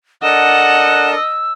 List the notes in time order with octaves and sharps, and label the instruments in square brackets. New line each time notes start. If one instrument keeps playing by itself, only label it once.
[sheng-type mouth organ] D4 A4 A#4 [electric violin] D#5 [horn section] F#5 [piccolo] E7
[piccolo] E6